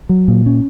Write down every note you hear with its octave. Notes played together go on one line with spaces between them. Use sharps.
F#3
A#2
C#4